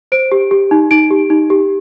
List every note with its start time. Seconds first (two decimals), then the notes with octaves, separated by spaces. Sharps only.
0.12 C5 D7
0.32 G4
0.51 G4
0.71 D#4
0.91 D#4 D7
1.11 G4
1.30 D#4
1.50 G4